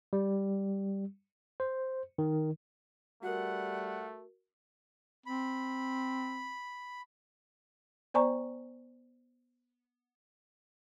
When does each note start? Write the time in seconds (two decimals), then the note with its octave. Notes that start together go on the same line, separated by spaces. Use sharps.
0.13 G3
1.60 C5
2.18 D#3
3.23 G3 A3 F#4 A#4 F#5
5.26 C4 B5
8.14 B3 C5 D5 G#5 A#5 C#6